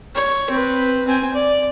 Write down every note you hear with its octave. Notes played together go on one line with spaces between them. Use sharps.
C#5
C4 B4
C4 G#5
D5